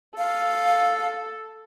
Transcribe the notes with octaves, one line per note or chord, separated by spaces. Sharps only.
A4 F5